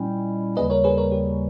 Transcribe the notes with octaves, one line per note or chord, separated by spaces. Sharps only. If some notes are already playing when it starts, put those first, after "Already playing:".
Already playing: A#2 G3 C#4 E4 D#5 G5
D#2 C#3 G3 B4 D#5
A#4 C#5
G#4 B4
A#4 C#5
G4